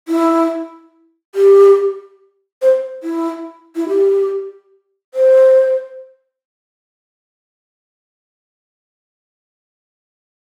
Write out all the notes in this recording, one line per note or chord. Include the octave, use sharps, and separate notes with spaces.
E4
G4
C5
E4
E4
G4
C5